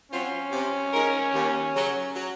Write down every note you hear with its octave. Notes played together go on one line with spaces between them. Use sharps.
F#3 C4 C#4 F4 C5
C3
D#3 G#3 D#4 A#4
D#2
C#3 F#3
F#3